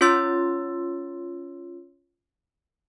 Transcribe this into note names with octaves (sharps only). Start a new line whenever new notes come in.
C#4 F4 C#5 C6 E6 A6